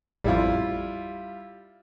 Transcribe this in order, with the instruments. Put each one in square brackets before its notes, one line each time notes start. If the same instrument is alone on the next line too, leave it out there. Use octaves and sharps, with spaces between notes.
[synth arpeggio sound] A1 F2 [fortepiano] G3 E4 F4